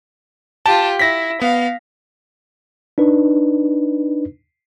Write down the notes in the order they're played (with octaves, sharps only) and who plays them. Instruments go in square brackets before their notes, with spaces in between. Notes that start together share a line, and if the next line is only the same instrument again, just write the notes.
[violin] F4 G4 [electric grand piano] A5
[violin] E4 [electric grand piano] A#6 B6
[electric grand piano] B3 [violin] F5
[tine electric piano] D4 D#4 B4